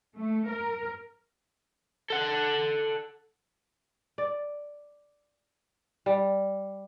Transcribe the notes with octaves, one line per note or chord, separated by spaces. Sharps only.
A3
A#4
A4 F#5
D5
G3